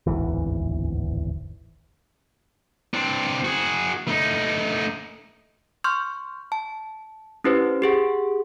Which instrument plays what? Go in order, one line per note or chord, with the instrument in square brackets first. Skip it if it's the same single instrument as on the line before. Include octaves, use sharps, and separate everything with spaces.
[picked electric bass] D1 G#1 E2 E3
[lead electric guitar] C4 D4
F#4 G#4
A3 D#4
[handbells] C6 C#6 F6 G6
A5
C#4 E4 G4 B4 C5
G4 G#4 F#5